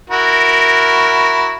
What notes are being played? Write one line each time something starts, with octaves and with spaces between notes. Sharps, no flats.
E4 F#4 A#4